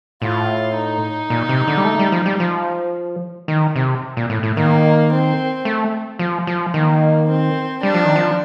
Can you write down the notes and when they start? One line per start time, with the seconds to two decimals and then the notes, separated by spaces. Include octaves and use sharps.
0.22 A2 F4
0.76 D#4
1.30 A#2
1.49 C3
1.68 D3
1.77 G3
1.85 A3
1.99 G3
2.12 F3
2.26 G3
2.40 F3
3.48 D#3
3.76 C3
4.17 A#2
4.30 A2
4.43 A2
4.57 D#3 A#3
5.12 C4
5.65 A3
6.19 F3
6.47 F3
6.74 D#3 A#3
7.28 C4
7.83 G3 D4
7.94 F3
8.05 D#3
8.16 F3